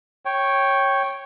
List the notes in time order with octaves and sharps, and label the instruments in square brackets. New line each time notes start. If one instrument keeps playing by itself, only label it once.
[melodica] C#5 G5